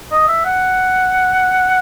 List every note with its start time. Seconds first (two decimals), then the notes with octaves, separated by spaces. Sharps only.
0.11 D#5
0.28 E5
0.45 F#5